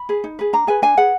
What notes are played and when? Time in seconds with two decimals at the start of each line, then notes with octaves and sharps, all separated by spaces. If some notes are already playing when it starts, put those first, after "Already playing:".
Already playing: B5
0.09 G#4 B4
0.24 D#4
0.39 G#4 B4
0.53 D4 A#5
0.67 G#4 B4 G#5
0.82 D4 G#5
0.97 G#4 B4 F#5